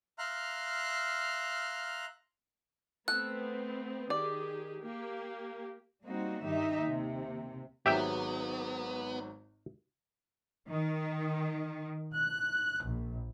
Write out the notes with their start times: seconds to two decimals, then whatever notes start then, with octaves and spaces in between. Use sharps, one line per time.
0.19 E5 F5 A#5 C6 F6 F#6
3.08 A3 B3 C4 A4 F#6
4.10 D#3 G4 G#4 D5
4.82 A#3 G4
6.04 G3 A#3 C4 D#4 F#4
6.47 G2 D#3 D#4 G4 E5
6.82 D#2 C3
7.86 G#1 G#2 F#3 B3 G4 E5 G5
10.69 D#3
12.14 F#6
12.85 A#1